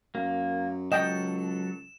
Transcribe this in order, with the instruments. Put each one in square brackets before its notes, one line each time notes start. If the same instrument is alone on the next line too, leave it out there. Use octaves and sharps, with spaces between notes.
[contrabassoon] F#2 [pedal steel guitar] A#3
[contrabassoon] C#2 [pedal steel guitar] F#3 A4 [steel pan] D#5 G5 [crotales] E7